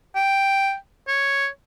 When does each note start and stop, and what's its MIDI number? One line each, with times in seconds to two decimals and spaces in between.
0.15 0.75 79
1.08 1.48 73